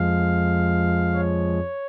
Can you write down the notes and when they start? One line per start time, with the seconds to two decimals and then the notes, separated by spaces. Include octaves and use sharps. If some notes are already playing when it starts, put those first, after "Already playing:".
Already playing: F2 F3 G#3 F5
1.14 C#5